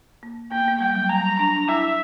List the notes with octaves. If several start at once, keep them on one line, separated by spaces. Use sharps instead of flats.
A#3
A#3 G5
B3
A#3
G3 G5
F#3
G3 A#5
D4 A#5
D4
E4 E5